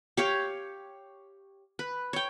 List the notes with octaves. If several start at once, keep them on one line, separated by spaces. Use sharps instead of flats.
G4 C#5 F5
B4
C#5 G5